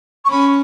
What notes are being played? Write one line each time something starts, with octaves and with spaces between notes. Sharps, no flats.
C#6
C#4 B5